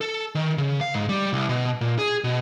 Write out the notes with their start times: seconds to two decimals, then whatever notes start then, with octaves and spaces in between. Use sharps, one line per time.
0.01 A4
0.35 D#3
0.58 C#3
0.81 F5
0.94 G#2
1.09 G3
1.33 C2
1.49 B2
1.81 A#2
1.99 G#4
2.24 B2